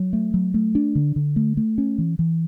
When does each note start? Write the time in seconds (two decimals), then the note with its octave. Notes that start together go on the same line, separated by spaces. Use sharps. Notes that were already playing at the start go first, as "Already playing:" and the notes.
Already playing: F#3
0.13 A3
0.34 F#3
0.54 A3
0.75 D4
0.95 D3
1.16 D3
1.36 A3
1.57 A3
1.78 C#4
1.98 E3
2.19 E3